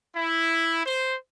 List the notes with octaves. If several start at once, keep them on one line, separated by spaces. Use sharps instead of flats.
E4
C5